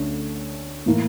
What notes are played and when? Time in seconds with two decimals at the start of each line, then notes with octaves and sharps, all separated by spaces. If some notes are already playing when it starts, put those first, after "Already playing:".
Already playing: D2 D3 A3 C#4
0.86 A2 E3 A#3 E4